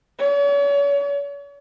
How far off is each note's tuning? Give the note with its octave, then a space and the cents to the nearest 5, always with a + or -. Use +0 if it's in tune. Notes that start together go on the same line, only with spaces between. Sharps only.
C#5 +40